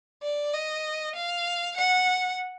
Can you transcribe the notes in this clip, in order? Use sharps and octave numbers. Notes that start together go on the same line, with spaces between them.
D5
D#5
F5
F#5